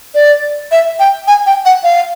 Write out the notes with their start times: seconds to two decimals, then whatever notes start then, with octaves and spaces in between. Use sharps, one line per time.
0.15 D5
0.72 E5
1.00 G5
1.28 G#5
1.46 G5
1.66 F#5
1.84 F5